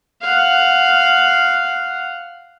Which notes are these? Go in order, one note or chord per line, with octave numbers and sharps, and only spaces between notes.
F5 F#5